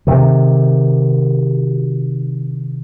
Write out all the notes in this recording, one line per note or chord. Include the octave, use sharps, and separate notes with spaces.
C3 D#3